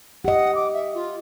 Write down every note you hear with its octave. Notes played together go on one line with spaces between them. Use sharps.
G4 D#5 F#5
D6
E5
F4